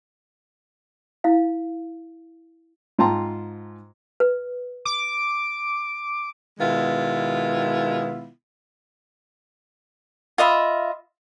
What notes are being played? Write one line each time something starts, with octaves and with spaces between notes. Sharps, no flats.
E4 F5
G#2 F4 G5 A5 A#5 C6
B4
D6
B2 D#3 G#3 B3 E4 F4
F4 D#5 E5 B5